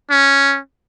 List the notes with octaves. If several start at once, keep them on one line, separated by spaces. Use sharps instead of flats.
C#4